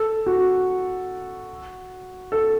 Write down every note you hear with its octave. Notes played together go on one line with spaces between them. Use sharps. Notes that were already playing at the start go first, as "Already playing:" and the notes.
Already playing: A4
F#4
A4